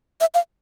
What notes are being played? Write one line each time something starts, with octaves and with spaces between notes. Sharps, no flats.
E5
F5